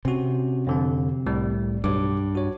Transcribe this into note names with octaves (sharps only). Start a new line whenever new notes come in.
C3 C#4 F#4
F2 D3 C4
C2 A2 G3
B1 G2 D6
F#4 C#5